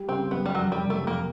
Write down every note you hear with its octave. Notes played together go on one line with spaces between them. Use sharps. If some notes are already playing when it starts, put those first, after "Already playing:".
Already playing: G3
C#3 C4
F#2 B3
G3
F2 F#3
G3
C3
A3
F2
A#3